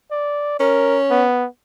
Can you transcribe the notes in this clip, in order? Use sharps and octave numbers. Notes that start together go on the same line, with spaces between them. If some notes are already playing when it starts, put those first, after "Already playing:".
D5
C#4 A#4
B3